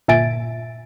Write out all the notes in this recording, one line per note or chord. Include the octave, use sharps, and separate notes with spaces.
G1 A#2 E5 G#5 A6 D7